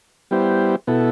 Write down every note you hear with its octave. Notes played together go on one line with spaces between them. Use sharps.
G3 B3 E4 G4 C5
B2 B3 E4 A4